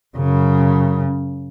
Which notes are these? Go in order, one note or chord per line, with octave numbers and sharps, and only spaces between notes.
F#2 C#3